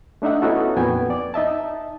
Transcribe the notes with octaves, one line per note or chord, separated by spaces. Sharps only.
A3 D4 D#4 E5 F#5
B3 C#4 D#4 E4 F#4 A4
F2 A#2 B3 G5 G#5
D5
D#4 D#5 E5 A5